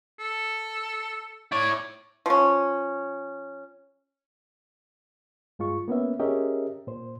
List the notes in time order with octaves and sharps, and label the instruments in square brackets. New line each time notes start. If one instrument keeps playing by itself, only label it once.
[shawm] A4
[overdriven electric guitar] E4 C#5 [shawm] D5
[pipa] F3 C#4
[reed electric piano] G2 G#3 F4 C#6
A#3 B3 C#4 E5
C#4 G4 G#4 A#4 D#5 E5
A#2 C5